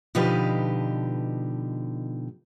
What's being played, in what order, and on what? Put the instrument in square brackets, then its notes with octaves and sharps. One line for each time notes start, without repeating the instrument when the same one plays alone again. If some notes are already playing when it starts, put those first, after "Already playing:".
[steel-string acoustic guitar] B2 D3 F3 D#4 G4 B4